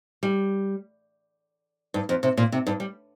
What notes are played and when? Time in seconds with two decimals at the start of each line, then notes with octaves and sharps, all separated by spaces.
0.23 G3
1.94 G2
2.09 F2
2.23 C3
2.37 A#2
2.52 C3
2.67 G2
2.80 G3